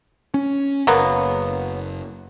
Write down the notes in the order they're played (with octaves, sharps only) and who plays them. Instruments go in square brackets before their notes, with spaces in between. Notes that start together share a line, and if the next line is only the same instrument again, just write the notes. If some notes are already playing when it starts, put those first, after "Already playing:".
[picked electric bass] C#4
[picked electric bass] F#1 [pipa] F#3 A#3 B3